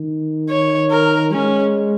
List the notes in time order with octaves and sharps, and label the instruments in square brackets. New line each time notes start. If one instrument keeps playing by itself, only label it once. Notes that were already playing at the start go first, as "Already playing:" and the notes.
Already playing: [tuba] D#3
[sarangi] C#5
A#4
[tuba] G#3 [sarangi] C#4